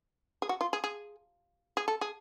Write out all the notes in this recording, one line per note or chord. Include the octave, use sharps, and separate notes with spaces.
G#4
F#4
F4
G#4
G#4
G#4
A4
G#4